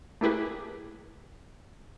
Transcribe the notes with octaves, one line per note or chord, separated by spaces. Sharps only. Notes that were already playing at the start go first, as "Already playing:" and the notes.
A3 A#3 E4 G4 G#4 B4